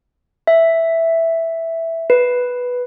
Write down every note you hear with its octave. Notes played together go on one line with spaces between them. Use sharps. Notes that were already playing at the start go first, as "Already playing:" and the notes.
E5
B4